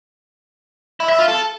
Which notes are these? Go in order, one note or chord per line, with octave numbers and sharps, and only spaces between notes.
E4
E5
F4
A4